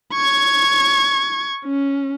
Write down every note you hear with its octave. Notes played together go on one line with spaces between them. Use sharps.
C#6 G#6
C#4